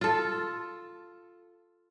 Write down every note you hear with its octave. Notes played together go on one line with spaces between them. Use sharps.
F4 A4